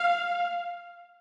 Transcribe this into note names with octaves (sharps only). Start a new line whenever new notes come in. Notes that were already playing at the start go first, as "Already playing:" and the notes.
Already playing: F5